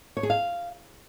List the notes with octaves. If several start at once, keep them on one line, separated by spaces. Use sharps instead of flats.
C#5
G#4
F5